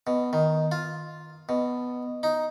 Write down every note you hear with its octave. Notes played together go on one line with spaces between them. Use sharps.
B2
D#3
F4
B2
D#4